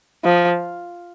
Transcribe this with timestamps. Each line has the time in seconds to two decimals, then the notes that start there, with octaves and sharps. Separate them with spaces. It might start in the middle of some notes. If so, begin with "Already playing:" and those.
0.24 F3